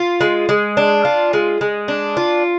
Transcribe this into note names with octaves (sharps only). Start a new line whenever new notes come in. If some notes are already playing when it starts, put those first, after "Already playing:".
Already playing: F4
G#3
G#3
D4
F4
G#3
G#3
D4
F4